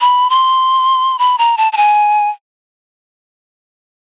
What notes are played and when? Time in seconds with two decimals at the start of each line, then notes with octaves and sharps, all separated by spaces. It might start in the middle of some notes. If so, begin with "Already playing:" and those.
0.01 B5
0.30 C6
1.19 B5
1.38 A#5
1.57 A5
1.73 A5
1.77 G#5